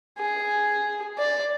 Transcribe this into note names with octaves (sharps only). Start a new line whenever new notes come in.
G#4
D5